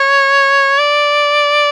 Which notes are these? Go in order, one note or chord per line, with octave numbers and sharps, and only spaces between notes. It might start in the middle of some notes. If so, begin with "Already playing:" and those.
Already playing: C#5
D5